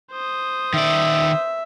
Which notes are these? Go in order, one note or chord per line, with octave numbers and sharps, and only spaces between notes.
C5 D#6
D#3 D5 E5